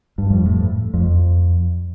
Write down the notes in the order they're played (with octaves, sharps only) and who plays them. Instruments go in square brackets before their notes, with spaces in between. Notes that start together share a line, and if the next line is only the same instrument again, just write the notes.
[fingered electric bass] G2
F2
A2
F2